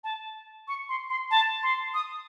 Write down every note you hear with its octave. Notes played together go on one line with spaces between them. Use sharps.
A5
C#6
C6
C6
A5
C6
D#6